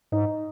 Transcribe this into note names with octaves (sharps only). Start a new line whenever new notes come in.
G#2 D#4